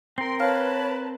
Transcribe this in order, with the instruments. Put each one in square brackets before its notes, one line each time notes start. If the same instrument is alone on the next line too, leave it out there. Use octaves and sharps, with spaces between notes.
[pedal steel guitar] C4 A#4 [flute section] G5 C6 [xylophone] C7
[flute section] B4 A5 [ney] C#5 [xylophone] F5 F6